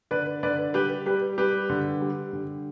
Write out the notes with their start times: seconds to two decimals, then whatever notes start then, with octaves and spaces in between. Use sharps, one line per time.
0.11 D3 B4 D5
0.43 D3 B4 D5
0.74 G3 G4 B4
1.06 G3 G4 B4
1.38 G3 G4 B4
1.70 D3
2.02 G3
2.33 D3